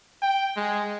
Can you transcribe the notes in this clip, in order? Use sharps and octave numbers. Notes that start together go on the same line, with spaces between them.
G5
G#3